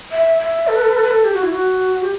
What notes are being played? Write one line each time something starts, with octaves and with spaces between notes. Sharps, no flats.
E5
E5
A4
B4
A4
B4
A4
B4
A4
G4
F#4
E4
F#4
G4